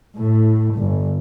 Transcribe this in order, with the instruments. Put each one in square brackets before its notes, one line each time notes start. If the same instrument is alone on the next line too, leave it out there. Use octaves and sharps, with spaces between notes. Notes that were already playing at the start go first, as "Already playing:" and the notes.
[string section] A2
G1